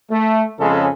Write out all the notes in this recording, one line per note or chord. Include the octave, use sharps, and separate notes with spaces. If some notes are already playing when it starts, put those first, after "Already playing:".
A3
F2 C#3 G#3 C#4 A4